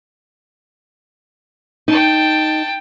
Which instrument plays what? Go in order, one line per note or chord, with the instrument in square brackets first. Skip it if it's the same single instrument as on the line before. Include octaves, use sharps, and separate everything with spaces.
[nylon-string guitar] D#4 [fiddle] G5 A5